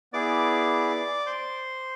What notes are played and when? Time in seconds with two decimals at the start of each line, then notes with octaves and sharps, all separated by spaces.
0.13 B3 E4 G#4 D5 D6
1.26 C5 C6